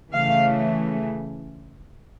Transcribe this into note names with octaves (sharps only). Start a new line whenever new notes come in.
C#3 E3 A3 C#4 F5